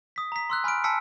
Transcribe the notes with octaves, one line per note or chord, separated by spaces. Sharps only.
D#6 B6
A#5 B6
C6 E6 F#6
G#5 B5 F6 F#6 D7
G#5 A5 E6 B6 C#7